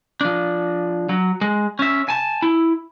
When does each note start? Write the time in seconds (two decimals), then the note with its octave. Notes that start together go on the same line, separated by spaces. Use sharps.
0.21 F3 D4
1.09 F#3
1.41 G#3
1.79 C#4 E5
2.09 G#5 A5
2.42 E4